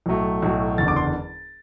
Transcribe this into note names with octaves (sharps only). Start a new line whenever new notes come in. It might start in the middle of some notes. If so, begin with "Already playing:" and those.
B1 A2 F#3 A3
B1 A2 F#3 A3
F#1 E2 D3 A6
D6
C6